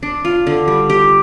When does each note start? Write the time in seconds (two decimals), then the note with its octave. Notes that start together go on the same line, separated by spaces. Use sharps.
0.03 D4
0.25 F4
0.47 D3
0.68 G3
0.90 G4